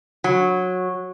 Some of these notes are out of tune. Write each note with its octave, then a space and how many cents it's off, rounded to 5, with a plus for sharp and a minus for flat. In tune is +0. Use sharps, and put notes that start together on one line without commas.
F#3 -15